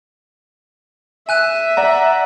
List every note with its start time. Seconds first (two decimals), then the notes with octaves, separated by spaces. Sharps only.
1.29 E5 G#5 F#6 D#7
1.77 D5 F#5 A#5